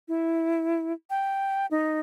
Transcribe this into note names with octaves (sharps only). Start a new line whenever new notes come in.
E4
G5
D#4